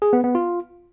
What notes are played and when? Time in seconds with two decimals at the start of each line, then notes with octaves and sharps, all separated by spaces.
0.02 G#4
0.13 B3
0.24 B3
0.35 F4